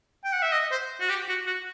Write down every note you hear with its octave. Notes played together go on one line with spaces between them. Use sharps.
G5
F#5
E5
D#5
C5
F#4
G4
F#4
F#4